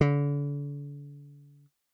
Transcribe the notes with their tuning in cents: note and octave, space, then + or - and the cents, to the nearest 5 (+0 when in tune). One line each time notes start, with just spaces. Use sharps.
D3 -40